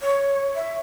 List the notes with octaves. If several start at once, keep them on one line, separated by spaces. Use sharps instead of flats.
C#5
E5